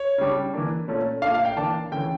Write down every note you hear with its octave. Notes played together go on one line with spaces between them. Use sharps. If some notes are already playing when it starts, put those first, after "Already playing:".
Already playing: C#5
C#3 G3 D4
E3 A#3 D4
A#2 A3 C#4
A#2 A3 D4 F5
F5
G5
E3 A#3 D4 A5
C#3 E3 A3 G5